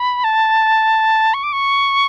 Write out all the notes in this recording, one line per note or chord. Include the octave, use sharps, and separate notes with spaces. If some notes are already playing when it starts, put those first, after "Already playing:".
Already playing: B5
A5
C#6
D6
C#6